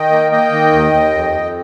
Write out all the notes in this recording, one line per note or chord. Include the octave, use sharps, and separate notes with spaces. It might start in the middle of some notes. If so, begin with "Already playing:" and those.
Already playing: D#3 D#5 G5
A#3
A#3 D#5 G5
D#3
D#2
D#2
F2
F2